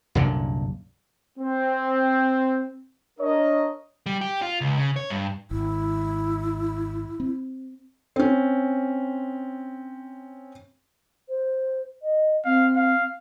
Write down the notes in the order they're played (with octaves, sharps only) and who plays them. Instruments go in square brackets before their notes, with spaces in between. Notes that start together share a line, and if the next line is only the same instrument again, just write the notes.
[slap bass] C2 F#2 A#2 D3
[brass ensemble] C4
D4 A#4 C#5 D#5
[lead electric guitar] G3
G4
F4
C#2
C#3
C#5
G2
[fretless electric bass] G#1 [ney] E4
[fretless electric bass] C4
[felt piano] C4 C#4
[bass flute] C5
D#5
[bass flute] C4 [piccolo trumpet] F5
[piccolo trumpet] F5